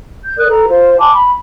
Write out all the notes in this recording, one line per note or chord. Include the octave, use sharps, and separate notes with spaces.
G6
A#4 D5 D#6 F#6
A4 B4 A#5
F4 C5
G#5 A5 C6 D6
B5